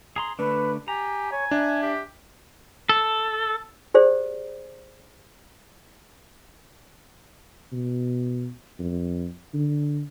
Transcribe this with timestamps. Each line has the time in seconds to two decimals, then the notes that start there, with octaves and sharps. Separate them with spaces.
0.16 G#4 A#5 C6
0.39 D3 A3 D4 B4
0.88 G4 G#5 A#5
1.32 C#5 G#5
1.51 D4 E5
1.82 G4
2.89 A4
3.94 G4 G#4 C5 D5
7.72 B2
8.80 F2
9.54 D3